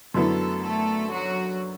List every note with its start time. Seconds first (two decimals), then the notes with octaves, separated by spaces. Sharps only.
0.14 F#2 D3 F#3 A3 B3 E4 A4
0.63 A3 A4
1.12 F#3 F#4